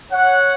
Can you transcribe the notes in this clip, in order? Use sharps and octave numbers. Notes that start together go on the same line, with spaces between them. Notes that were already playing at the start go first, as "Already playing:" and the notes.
C#5 F#5